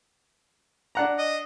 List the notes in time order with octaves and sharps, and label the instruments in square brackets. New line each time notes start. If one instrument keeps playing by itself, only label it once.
[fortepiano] D4 F#5 A#5
[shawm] D#5